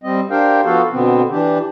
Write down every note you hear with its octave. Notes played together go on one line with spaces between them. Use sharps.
G3 C4 D#5
D4 G4 A#4 C5 F5 G5
F3 B3 F#4 A4 F5
B2 D3 B3 C4
E3 D4 G4